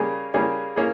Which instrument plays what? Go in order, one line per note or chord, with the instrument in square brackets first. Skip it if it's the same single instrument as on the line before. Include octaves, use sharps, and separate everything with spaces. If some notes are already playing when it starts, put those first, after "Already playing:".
Already playing: [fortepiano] C#3 G3 A#3 C#4 G#4
C#3 G3 A#3 C#4 G#4
A#3 C#4 G#4